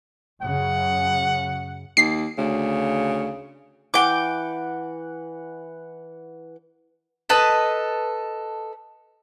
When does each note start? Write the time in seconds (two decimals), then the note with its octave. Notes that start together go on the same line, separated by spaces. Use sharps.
0.43 F#2 C#3 F#5
1.97 D#2 C7
2.38 D2 C#3
3.94 E3 F#5 G5 D6
7.29 A4 B4 D#5 A5